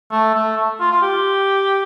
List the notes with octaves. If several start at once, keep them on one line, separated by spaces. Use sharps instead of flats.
A3
A3
A3
F4
F4
G4